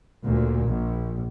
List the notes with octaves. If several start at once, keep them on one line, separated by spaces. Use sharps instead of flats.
D2 A#2
A#1